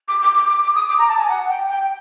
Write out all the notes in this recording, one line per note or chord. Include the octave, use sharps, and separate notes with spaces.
D6
D6
D6
D6
D6
D#6
D6
A#5
A5
G#5
F#5
G5
G5